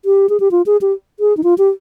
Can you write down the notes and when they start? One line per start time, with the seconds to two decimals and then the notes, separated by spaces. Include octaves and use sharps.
0.05 G4
0.29 G#4
0.40 G4
0.51 F4
0.66 G#4
0.81 G4
1.20 G#4
1.37 D#4
1.44 F4
1.58 G4